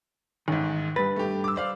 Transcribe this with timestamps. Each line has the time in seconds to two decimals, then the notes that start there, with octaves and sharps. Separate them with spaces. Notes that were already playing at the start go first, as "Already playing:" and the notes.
0.48 A1 G#2 D#3
0.96 G2 B4 A6
1.16 A3 G4
1.44 D6 E6
1.56 C5 D5 F5